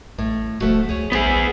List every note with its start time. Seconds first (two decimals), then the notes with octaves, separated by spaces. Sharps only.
0.18 A1 A2
0.61 D1 F3 A3 F#4
0.89 C#2 G#4 C#5
1.12 A#1 B3 E4 G#4 C5 E5